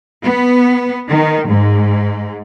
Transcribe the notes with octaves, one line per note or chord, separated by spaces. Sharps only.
B3
D#3
G#2